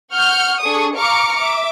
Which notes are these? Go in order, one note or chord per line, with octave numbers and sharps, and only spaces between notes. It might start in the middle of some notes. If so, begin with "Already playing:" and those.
F#5 C#6 F6 G6
D4 G#4 A4 C#6 D#6
F5 A#5 C#6 D6 F6 C#7
E5 D6